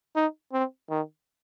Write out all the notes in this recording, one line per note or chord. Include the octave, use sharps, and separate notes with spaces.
D#4
C4
D#3